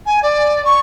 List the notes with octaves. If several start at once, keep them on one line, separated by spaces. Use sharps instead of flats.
G#5
D5
C#6